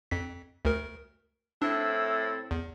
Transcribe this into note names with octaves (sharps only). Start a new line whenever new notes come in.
F2 B6
D2 A#4
A2 C4 D4 E4
E2